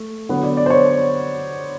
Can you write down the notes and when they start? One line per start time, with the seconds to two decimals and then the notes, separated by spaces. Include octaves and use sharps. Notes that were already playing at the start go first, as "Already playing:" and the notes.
Already playing: A3
0.29 D3 F#3 B3
0.43 D5
0.57 D5
0.66 C5
0.70 C#5